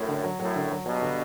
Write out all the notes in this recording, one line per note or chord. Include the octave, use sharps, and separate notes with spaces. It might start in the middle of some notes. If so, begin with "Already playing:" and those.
Already playing: F#2 A2
D3
F#3
F#2 A2 F#3
D3
F#3
G2 B2 F#3
D3